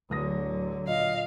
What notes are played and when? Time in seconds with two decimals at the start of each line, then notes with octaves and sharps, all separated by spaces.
0.10 D1 D3 F#3 D#6 A#6
0.88 A#2 D#5 F5